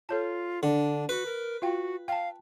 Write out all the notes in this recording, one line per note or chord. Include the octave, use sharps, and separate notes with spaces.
F4 A4 C#5 A5
D3 D4
F#4 B4
A#4
F4 F#4 F5 G5
F5 G5 A5